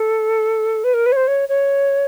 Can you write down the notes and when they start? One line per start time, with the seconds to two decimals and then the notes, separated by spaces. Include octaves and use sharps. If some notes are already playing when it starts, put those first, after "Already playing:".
Already playing: A4
0.84 B4
0.94 A#4
1.06 B4
1.12 C#5
1.16 C5
1.28 C#5
1.49 C#5